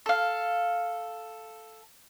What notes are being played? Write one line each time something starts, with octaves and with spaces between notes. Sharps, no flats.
A4 F5